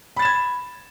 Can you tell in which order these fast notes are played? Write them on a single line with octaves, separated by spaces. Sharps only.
B5 A6 E7 G#6